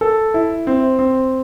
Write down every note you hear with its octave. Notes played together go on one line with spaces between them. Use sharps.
A4
E4
C4
C4